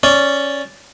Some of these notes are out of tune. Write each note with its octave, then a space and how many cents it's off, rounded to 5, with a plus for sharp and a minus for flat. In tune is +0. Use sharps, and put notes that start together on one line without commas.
C#4 +0 D5 -10